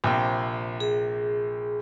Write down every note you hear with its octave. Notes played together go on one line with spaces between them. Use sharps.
A#1 C3 G5
G#4